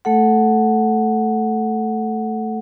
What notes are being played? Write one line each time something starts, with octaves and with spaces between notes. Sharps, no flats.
A3 A4 F#5